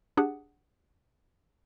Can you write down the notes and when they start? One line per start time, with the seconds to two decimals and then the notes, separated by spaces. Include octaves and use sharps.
0.17 D4 G4 G#4 F#5 A5